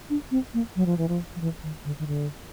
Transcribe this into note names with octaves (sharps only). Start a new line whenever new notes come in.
D4
C4
A#3
F#3
F3
E3
F3
F3
E3
D#3
D3
D#3
D3